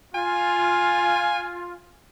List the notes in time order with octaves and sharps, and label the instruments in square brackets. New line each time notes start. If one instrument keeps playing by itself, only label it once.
[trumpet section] F4 [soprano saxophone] G#5